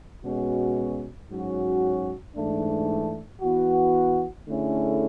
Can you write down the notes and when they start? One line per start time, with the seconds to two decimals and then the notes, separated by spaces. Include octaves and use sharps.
0.25 B2 G#3 C#4 F#4
1.31 G#2 F#3 C#4 F#4
2.35 G#2 E3 A3 D4
3.41 E3 B3 F#4
4.47 D3 A3 C#4 E4 G#4